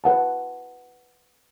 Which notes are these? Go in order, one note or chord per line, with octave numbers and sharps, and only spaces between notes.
B4 F#5 A5